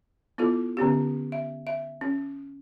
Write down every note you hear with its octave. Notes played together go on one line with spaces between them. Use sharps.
B3 E4 F4 A4
D3 B3 C#4 G4
E5
E5
C#4